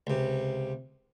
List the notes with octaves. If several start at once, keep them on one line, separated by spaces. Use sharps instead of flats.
C#2 C3